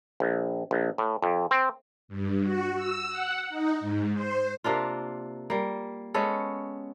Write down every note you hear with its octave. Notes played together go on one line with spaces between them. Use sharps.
A#1
A#1
A2
F2
C4
G2
F#4
E6
F#5
D#4
G#2
C5
C3 A#3 D4 F4
G3 A#3
G#3 B3 C#4 A4